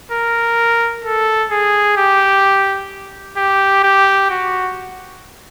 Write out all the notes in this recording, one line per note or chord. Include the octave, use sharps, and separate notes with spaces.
A#4
A4
G#4
G4
G4
G4
F#4